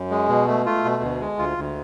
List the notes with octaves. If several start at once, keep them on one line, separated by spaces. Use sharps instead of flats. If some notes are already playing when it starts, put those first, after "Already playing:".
Already playing: F#2
G#3
B2
A3
A3 F4
B2
D2
G#3
D2 F4
D2